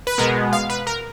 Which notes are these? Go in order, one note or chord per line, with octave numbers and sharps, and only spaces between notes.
B4
B2 G#3 B3 A#4
F5
B4
A#4